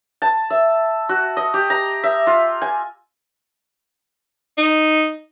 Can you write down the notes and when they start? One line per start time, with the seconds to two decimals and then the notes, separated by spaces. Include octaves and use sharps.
0.22 A5
0.50 E5
1.09 F#4
1.37 D#5
1.54 G4
1.70 A#5
2.04 E5
2.27 F4
2.62 G#5
4.58 D#4